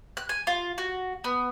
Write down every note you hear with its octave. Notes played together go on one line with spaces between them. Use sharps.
F#6
G#5
F4
F#4
B3